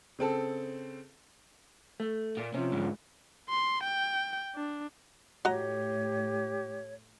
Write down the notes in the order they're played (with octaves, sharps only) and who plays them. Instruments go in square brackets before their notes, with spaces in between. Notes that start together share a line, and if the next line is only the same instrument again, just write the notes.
[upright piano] C#3 C4 A4 A5
[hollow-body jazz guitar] A3
[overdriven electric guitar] A#2
[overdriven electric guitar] C3 [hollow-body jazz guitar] F3 C#4
[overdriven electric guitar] G#2 D3
[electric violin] C6
G5
D4
[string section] A2 [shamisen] F#4 D#5 A#5 [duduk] G4 [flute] C#5